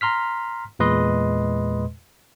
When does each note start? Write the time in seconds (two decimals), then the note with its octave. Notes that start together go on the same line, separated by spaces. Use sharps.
0.01 A#5 C6 F6 B6
0.79 E2 A#2 G#3 B4 D#5 C6